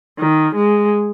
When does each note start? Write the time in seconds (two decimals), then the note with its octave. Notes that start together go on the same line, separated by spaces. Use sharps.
0.19 D#3
0.55 G#3